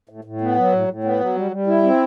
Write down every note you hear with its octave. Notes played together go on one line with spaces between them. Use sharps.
A2
A2
B3
F#3
A2
A2
B3
F#3
G3
G3
E4
C4